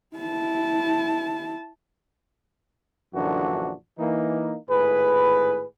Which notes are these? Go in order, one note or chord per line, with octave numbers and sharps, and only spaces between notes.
E4 A5
A#1 F#2 D3 E3 D4 F#4
E3 A#3 D#4
G#1 A2 G#4 B4